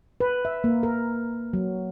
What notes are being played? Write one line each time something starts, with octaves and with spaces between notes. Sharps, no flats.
B4
E5
A#3
A#4
F#3